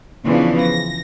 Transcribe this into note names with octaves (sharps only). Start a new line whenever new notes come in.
C#3 E3 F3 B3 D4
A#6